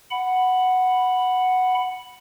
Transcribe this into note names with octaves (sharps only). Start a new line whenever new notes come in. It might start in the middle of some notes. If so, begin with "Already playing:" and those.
F#5 B5